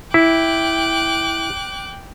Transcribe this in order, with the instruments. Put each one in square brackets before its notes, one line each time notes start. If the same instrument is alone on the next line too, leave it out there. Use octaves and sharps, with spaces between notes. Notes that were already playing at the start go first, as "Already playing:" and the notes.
[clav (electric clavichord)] E4 [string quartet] G5 D6 F#6